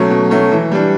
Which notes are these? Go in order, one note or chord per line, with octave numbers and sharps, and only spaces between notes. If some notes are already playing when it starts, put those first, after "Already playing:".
Already playing: B2 F#3 A3 C#4
B2
F#3 A3 C#4
E3
G3 D4